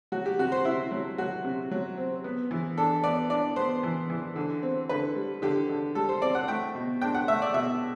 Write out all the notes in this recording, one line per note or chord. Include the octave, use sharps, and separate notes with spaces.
F#3 F#4
G4
C3 F#4
C5
C3 E4
F#3
F#3 F#4
C3
F#3
C4
B3
E3
D4 A4
B3 D5
D4 D5
B3 C5
E3
E3
D3
C4
D3 B4
G3
D3 G4
D3
G3 A4
C5
C4 D5
F#5
A3 G5
B2
D4 G5
F#5
A3 E5
D5
B2 E5